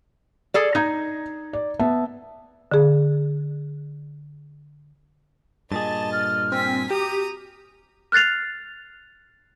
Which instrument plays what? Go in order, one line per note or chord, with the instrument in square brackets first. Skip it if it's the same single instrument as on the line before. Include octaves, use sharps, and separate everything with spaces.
[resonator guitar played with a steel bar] G#4 A4 D5
[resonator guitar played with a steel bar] D#4 [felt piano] A#5 G#6
[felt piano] D5
B3 E5 A5
[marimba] D3 G#4
[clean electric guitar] G2 A#2 G#4 [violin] D#5 [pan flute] A5 [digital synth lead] A6
[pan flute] F6
[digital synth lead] C4 [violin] G#5 B6
[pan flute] F#4 [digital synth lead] G4 [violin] A#5 D#6
[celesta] F6 F#6 A6 C7 F7